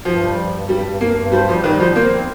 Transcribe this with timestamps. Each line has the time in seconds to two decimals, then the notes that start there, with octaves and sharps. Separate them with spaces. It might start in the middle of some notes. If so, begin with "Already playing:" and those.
0.05 G2 F3
0.20 G3
0.37 G2
0.52 G2
0.69 G2 G3
0.85 G2
1.01 G2 A#3
1.17 G2
1.32 G3 C5
1.48 F3 G3
1.64 D#3 G3
1.80 F3 C5
1.96 A#3 C5
2.13 C4